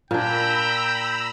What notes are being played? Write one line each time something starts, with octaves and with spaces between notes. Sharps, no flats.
A#2 D4 G5 A#5 B5 E6